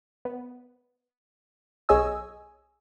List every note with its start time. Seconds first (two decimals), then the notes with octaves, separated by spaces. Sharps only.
0.25 B3
1.89 B1 G#4 C#5 D#5 G#5 E6